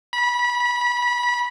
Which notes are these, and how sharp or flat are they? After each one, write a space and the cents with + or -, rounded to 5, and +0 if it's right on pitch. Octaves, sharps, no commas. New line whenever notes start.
B5 -25